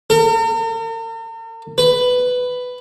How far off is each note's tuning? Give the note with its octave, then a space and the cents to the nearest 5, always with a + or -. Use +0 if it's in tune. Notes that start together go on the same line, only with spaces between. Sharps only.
A#4 -45
B4 +10